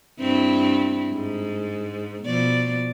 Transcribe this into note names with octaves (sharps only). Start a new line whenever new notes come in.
G2 C4 E4
G#2
B2 F3 D5